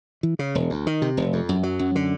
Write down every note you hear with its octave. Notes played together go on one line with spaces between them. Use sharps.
E3
C#3
E1
D2
D#3
C3
F1
F2
F#2
F#3
F#2
D3